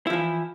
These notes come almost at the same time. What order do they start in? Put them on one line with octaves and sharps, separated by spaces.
E4 F3 E3